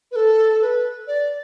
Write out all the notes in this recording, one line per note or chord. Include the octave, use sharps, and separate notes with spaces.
B4
A4
B4
D5